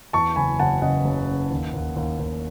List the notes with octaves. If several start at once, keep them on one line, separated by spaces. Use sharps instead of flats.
E2 A5 C#6
F#1 G#5 B5
F#1 F#5 A5
C#3 D#5 F#5
F#1
C#3
D#2
D#2
D#2
D#2